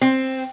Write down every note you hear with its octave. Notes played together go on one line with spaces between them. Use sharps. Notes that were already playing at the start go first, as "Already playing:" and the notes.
C4